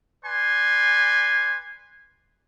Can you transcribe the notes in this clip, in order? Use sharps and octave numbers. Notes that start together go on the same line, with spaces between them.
B4 D5 G#5 C6